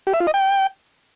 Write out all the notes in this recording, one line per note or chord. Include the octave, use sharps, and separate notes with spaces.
G4
E5
F4
D#5
G5